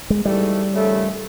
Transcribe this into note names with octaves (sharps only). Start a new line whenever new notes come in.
G#3
G#2 E3 G3 A3
D#2 C#3 F3 A3